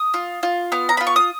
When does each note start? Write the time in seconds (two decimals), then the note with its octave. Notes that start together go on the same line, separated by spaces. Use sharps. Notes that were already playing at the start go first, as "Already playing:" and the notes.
Already playing: D#6
0.14 F4
0.43 F4
0.72 B3 F6
0.89 A#5
0.97 F4 B5
1.07 C#6
1.16 D#6